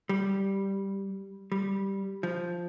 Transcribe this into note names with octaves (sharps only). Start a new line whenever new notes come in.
G3
G3
F3